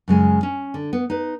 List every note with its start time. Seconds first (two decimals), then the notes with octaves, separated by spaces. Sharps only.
0.08 F#2 C#3 G#3 G#5
0.43 C#4
0.74 D3
0.93 B3
1.10 D#4 B4